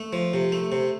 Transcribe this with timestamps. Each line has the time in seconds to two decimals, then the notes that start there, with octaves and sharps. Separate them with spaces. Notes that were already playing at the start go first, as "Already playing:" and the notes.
Already playing: A3
0.13 F3
0.34 C3
0.52 A3
0.72 C3